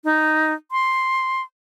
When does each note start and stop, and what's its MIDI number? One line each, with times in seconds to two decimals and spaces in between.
0.04 0.53 63
0.72 1.42 84